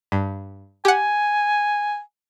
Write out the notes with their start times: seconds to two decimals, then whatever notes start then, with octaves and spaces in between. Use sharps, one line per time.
0.12 G2
0.85 G4 F#5 G#5